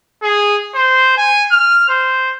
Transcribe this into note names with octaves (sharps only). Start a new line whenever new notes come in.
G#4
C5
G#5
F6
C5